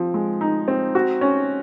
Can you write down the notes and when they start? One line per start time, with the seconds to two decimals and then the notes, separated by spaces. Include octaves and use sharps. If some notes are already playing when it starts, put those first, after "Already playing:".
Already playing: F3 C4
0.14 G#3
0.41 D#4
0.68 C4
0.95 F#4
1.21 C#4